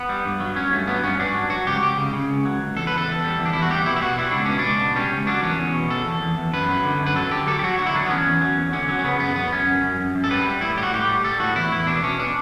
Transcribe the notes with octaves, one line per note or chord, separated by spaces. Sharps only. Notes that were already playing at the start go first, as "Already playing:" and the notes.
Already playing: B3
G3
G2
F#3
F#3 C#4
G2 A3
F#3 B3
G2 C#4
G2 D4
F#3
F#3 F#4
C#2 G4
C#2 G4
C#3
C#3
C#2
F#3
C#2
E2 A4
E2 B4
A4
E2
G3
E2
D4
E2 E4
F#4
G3 G4
B2 E4
E4
B2 F#4
G3 E4
C#2 D4
B2 C#4
D4
C#2
B2
G3 C#4
C#2
F#3 D4
E2 C#4
E2
B2
E2 A4
E2
E2
E2
F#2 B4
F#3
D3
F#2
B4
F#3 A4
D3 G4
F#3 A4
G4
F#3 F#4
D3 F#4
E4
F#3 D4
B3
E2 C#4
E2
F#3
E2
D3 C#4
F#3
C#4
C#3 B3
F#2 B3
F#2 B3
F#2 C#4
F#2
F#2
F#2
F#2
A4
G3 B4
G3
A2 E4
G3 G4
F#4
A2 G4
G3
G3 A4
A2 F#4
E2 E4
E2 E4
B2 D4
B2 C#4
D4